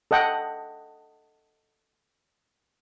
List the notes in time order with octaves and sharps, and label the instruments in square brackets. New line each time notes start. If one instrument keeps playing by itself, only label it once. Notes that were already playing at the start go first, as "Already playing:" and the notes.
[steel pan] A4 D#5 F#5 G5